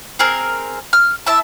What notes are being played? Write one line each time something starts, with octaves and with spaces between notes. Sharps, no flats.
C4 G#4 A#4
F6
E4 E5 A5